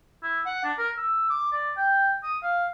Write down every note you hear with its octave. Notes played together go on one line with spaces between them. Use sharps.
E4
F#5
D4
A#4
E6
D6
D5
G5
D#6
F5